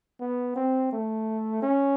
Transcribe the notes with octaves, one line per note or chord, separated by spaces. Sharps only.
B3
C4
A3
C#4